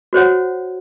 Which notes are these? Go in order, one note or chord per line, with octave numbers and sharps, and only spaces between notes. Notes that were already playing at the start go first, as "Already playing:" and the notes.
F#4 C5 C#5 F#5